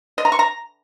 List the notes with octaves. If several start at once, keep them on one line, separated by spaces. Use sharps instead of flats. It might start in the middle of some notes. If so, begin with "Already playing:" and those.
D#5
A#5
C#6
A#5